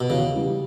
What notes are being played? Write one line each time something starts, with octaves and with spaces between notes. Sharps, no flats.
B2
E2 C#3
C#3 E3 G3